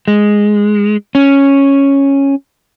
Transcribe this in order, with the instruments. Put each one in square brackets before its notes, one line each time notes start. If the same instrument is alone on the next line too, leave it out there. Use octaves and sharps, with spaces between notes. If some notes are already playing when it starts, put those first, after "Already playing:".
[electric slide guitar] G#3
C#4